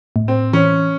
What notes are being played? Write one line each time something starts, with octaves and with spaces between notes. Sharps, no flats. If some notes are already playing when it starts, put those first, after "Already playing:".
A2
C4
E3 C#4